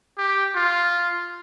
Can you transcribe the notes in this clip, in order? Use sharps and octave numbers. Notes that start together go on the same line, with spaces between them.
G4
F4